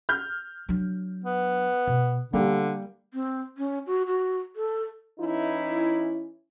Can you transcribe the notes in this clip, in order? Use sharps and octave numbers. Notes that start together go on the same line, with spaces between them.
F6 G6
F#3 D4
B3
B2
D3 G3 A#3 B3 G4
C4
C#4
F#4
F#4
A4
E3 C#4 D#4 E4